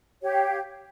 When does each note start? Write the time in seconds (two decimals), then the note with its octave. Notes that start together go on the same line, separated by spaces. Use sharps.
0.21 C#5
0.24 G4
0.26 G5
0.29 F5